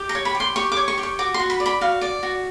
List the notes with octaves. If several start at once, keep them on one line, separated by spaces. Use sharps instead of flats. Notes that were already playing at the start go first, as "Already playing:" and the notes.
Already playing: G4
A#5
C#5
B5
G4
C6
G4 C#6
D6
C#5
C#6
G4
C#6
F#4 D6
C6
F#4
B5
D5
B5
F#4 F5
D5
F#4